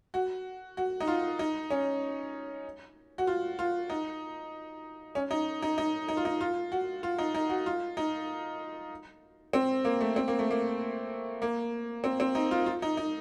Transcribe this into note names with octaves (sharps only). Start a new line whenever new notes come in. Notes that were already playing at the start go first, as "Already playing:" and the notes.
F#4
F#4
D#4
F4
D#4
C#4
F#4
F4
F4
D#4
C#4
D#4
D#4
D#4
D#4
F4
D#4
F4
F#4
F4
D#4
D#4
F#4
F4
D#4
C4
A#3
A3
C4
A#3
A3
A#3
A#3
C4
C4
D#4
F4
F4
D#4
D#4